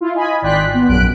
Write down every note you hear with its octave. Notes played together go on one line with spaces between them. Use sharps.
E4 F4
D#5 G#5 B5
G#1 D5 G5 C6 F#6 B6
B3
A#1 F#2 F#6 D7